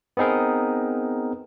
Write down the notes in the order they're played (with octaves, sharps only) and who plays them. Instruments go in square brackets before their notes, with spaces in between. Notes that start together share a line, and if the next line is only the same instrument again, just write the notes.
[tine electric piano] B3 C4 D#4 G#4 A#4